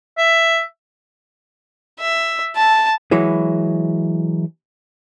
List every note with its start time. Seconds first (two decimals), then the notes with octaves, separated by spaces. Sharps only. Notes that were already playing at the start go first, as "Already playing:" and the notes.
0.18 E5
2.00 E5
2.56 A5
3.11 E3 F#3 G#3 E4